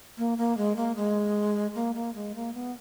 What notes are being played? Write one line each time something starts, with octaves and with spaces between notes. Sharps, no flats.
A#3
A#3
G#3
A#3
G#3
A#3
A#3
G#3
A#3
B3